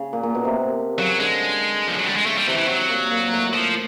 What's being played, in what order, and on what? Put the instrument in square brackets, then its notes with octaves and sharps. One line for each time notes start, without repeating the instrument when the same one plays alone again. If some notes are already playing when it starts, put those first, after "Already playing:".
Already playing: [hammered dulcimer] C#3
A#2
A#2
B2
C3
[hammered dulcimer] C#3 [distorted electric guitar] F#3
[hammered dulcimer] D3 [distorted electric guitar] G#3
[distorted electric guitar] F3
F#3
G3
G#3
[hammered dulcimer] C#3 [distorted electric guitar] A3
[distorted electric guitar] G3
[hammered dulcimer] C3 [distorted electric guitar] E3
[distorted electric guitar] E3
F#3
[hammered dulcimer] A#2
A#2
A2
[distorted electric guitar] F3